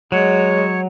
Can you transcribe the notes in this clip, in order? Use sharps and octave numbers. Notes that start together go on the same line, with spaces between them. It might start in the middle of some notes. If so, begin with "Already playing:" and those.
F#3 G#3 C#5